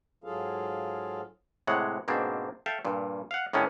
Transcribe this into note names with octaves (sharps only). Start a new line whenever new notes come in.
G#2 F#3 F4 G#4 A4 F5
A2 C3 G#3 C#5 F#5
G#2 B2 A#3 C4 D4
A4 E5 F5 G5
G2 A#2
F5 F#5
A2 D#3 G#3 A#3 C#4 D4